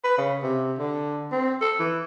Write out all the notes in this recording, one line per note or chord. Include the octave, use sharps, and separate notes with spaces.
B4
C#3
C3
D3
C4
A4
E3